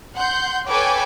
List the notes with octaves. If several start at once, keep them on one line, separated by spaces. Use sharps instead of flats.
F#5 C6 G6
A4 B4 C#5 G5 G#5 D6